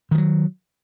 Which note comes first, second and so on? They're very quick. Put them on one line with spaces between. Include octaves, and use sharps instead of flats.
D#3 F3 F#3